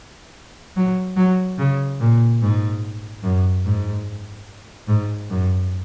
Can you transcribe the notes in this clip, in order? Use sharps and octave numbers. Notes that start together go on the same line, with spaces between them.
F#3
F#3
C#3
A#2
G#2
F#2
G#2
G#2
F#2